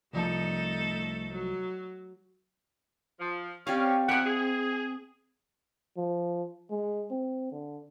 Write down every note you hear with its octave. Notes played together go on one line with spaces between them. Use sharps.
C2 F3 A3 D#4 A4 A5
F#3
F3
C4 C#4 G4 D5 F5
F2 G4 E5 F#5 G#5
G#4
F3
G#3
C4
D3